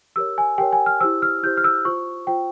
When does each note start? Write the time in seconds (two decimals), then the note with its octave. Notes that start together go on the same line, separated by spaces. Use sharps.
0.16 G4 A#4 C#5 E6
0.38 G#5
0.58 G4 A#4 C#5 G5
0.73 G#5
0.86 F6
1.00 E4 G4 C5 E6
1.22 F6
1.43 E4 G4 C5 G6
1.57 F6
1.64 E6
1.85 F4 C5 C#6
2.27 F4 C5 G5